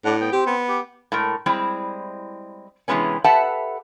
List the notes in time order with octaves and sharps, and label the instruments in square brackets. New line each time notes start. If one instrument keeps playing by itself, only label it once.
[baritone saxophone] A2 [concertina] D4 F#5
[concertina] B3 G5
[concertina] C4 [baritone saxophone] G4
[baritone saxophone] B3
[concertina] G4
[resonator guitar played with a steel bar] A2 G#3 A#4
G3 G#3 C4 E4
C3 E3 G3 G#3 B3 C#4
G4 A4 B4 E5 F#5 A5